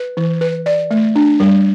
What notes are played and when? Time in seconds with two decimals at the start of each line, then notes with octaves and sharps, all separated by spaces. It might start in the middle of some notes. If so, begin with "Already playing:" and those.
Already playing: B4
0.17 E3
0.41 B4
0.66 D5
0.91 A3
1.16 D4
1.40 G3